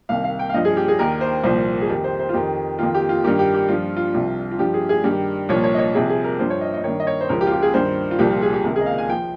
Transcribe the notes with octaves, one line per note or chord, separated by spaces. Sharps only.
C2 C3 D#3 F5
F5
G5
F5
G2 F3 D#5
G#4
G4
G#4
D#2 D#3 A#4
C5
C2 A#2 F3 C5
G#4
F2 D#3 G4
C5
C5
F4
F2 D#3 G4
F2 D#3 F4
G4
F4
G2 D#3 G4
G4
G4
G2 F3 F4
F4
C2 C3 F3
F4
G2 F3 G4
G#4
G#4
G2 D#3 G4
C2 A#2 F3 C#5
C#5
D#5
C#5
C2 C3 F3 G#4
G#4
A#4
G2 F3 C5
C#5
D#5
D#5
G2 D#3 C#5
D#5
C#5
C5
C#2 C#3 F3 A#4
G4
F4
G4
G#4
G2 D#3 C5
F4
C2 A#2 F3 G4
F4
G#4
G4
C#2 C3 D#3 A#4
G#4
D#5
F5
G#5
F3 G5